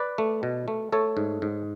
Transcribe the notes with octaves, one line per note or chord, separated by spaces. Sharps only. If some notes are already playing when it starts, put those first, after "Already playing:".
Already playing: B4 D5
A3
B2
A3
A3 A4 C#5
G#2
G#2